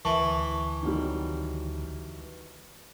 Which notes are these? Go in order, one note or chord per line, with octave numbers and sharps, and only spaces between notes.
D2 E3 A5 C#6
D#3 F#3 G3